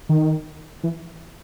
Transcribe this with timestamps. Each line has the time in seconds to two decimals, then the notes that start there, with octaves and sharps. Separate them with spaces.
0.09 D#3
0.84 E3